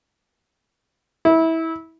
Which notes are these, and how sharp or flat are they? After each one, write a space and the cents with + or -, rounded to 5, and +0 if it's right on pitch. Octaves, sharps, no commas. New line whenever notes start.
E4 -20